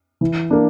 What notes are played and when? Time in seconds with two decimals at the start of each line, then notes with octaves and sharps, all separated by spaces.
0.21 E3
0.51 A#3 D4